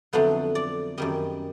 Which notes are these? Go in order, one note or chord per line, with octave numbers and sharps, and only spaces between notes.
F2 D3 F#3 B3 E4 C5
D5
F#2 D#3 G3 D#5